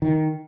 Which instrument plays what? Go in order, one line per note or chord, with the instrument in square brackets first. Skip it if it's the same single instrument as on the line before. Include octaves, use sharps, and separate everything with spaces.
[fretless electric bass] D#3